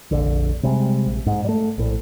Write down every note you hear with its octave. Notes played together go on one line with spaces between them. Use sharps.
F1 A#1 D3
C3 G3 G#3
A#1
G#2
G3 A3
A#1 A2